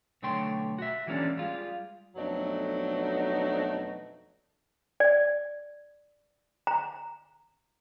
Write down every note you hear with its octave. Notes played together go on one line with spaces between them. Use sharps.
B1 D3 A3 C#5 G5 C6
F#4 E5
E3 G#3 A#3 C#4 D4
G3 G#3 F4
F2 B2 F#3 A3 D4 D#4
D5
A#5